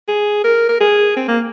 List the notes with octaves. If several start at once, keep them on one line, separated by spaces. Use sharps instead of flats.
G#4
A#4
A#4
G#4
C4
A#3